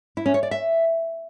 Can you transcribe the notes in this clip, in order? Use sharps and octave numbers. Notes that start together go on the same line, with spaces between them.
E4
C#4
C#5
D5
E5